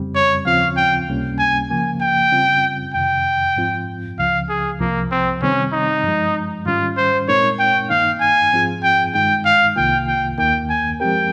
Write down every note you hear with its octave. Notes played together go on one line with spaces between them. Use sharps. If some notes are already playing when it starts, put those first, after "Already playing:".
Already playing: F2 C#3 G3 C4
C#5
D#2 C#3 F3 C4 F4 F5
G5
C#2 C3 G3 A#3 C#4
G#5
C#3 F3 A#3 G#5
G5
C#3 G3 C4 F4
F2 C3 D#3 G5
G#2 F3 C4 F4
C#2 C#3 F3 F5
G#4
C2 C3 F3 A#3
C4
C3 D#3 G3 C4 C#4
D#4
G2 F3 G#3
G#2 D#3 G3 C#4 F4
C5
A#2 G#3 C4 D#4 A#4 C#5
G5
G2 D#3 A#3 D#4 F5
G#5
G#2 F3 C4 F4 G#4
G5
G2 D#3 G#3 D#4 G5
F5
C2 C3 D#3 A#3 F4 G5
G5
D#2 D#3 A#3 G5
G#5
F3 G#3 C4 G4 A#4 G5